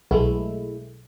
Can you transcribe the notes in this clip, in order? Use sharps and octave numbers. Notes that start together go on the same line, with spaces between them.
B1 G#3 A3 E4